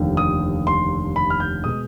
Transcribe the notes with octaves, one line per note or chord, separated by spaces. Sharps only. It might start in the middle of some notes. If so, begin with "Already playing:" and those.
Already playing: F1 D#2 D3 F3
D#6
C6
B5
F6
G6
B2 G#3 D#6